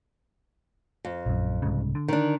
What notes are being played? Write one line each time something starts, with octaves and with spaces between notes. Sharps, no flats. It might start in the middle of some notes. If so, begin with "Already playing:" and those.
F2
A#1 F#2
C2 G#2 C#3
D3
D#3 D4